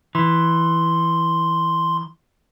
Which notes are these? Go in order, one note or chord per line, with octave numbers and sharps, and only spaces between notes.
E3 C6